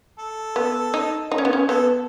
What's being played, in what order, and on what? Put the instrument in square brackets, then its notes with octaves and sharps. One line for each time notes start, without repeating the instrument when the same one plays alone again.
[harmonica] A4
[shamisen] B3
D#4
D#4
C#4
B3
C#4
[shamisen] B3 [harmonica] A4